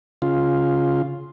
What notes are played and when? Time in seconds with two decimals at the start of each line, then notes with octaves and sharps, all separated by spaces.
0.22 C#3 F4